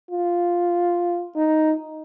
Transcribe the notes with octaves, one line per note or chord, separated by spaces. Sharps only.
F4
D#4